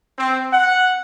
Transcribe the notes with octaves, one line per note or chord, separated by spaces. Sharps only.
C4
F#5